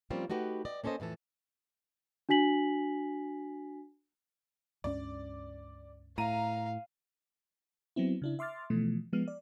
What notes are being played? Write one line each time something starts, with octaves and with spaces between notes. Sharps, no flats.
F3 G3 A#3 C4 C#4 F4
A3 D#4 F#4 G4 B4
D5 D#5
A#3 C#4 A4 C5 D#5
F2 A2 E3 A4
D4 F#4 G#5 B6 F#7
C#2 G2 C#4 D5
A2 F5 A#5 D#7
F#3 B3 C4 E4
C#3 D4 E4
E5 C6 D6 F6 A6
B2 E3 F3 A3
F3 G#3 B3 F6
D5